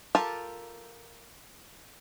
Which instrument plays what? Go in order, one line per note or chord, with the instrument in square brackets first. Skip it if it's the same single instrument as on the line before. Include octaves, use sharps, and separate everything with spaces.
[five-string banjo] F4 G4 A4 A#4 A5